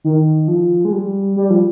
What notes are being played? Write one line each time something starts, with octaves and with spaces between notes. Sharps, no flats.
D#3
F3
G#3
G3
G3
F3